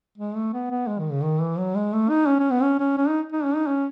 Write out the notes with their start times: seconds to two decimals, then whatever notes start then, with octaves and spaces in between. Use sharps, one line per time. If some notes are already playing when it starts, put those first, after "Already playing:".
0.18 G#3
0.36 A3
0.53 B3
0.71 B3
0.88 G#3
0.99 D#3
1.12 C#3
1.23 D#3
1.41 E3
1.58 F#3
1.75 G#3
1.93 A3
2.10 D#4
2.28 C#4
2.39 C#4
2.51 B3
2.62 C#4
2.80 C#4
2.97 C#4
3.09 D#4
3.32 D#4
3.44 C#4
3.55 D#4
3.67 C#4